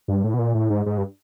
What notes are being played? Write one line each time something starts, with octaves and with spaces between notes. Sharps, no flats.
G2
A2
B2
A#2
A2
G#2
G#2
G2